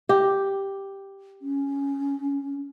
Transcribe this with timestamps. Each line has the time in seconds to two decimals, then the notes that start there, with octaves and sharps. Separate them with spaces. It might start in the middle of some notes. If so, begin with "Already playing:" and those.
0.09 G4
1.42 C#4